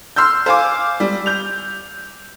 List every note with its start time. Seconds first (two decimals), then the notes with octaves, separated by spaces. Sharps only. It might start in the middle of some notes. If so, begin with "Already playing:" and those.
0.16 C6 E6 F6 G6
0.46 C5 F5 G#5 D6
1.00 G3
1.26 G6 F7